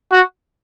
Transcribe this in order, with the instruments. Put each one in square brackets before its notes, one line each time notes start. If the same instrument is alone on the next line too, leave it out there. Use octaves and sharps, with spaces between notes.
[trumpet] F#4